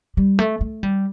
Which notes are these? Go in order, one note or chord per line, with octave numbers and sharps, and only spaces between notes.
G3
A3
A3
G3